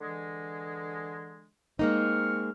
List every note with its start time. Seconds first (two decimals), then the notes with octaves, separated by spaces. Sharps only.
0.01 D3 E3 G#3
1.79 G#3 A#3 C4 D#4 C#6 F6